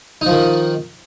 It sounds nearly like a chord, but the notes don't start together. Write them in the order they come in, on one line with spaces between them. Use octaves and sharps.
D#4 F3 D#3